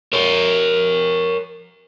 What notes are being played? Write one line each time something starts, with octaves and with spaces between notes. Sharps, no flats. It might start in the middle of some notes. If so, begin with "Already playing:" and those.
A#4 C#5